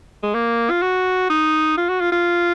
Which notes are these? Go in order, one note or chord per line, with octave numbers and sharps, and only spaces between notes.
G#3
A#3
F4
F#4
D#4
F4
F#4
F4
F4